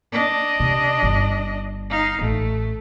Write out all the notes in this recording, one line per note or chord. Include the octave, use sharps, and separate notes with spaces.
D4 D#5
C3
G1
D#4 F5
A1 A3